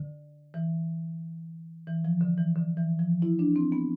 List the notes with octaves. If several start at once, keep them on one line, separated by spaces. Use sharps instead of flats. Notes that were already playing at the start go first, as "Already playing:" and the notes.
Already playing: D3
E3
E3
F3
D3
E3
D3
E3
F3
E4
D4
C4
B3